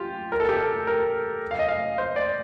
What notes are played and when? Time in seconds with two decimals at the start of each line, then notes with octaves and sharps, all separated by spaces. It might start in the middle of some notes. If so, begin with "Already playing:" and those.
Already playing: F4 G4
0.32 A#4
0.40 A4
0.49 G4
0.57 A4
0.87 A#4
1.51 F5
1.59 D#5
1.68 F5
1.98 C5
2.16 D5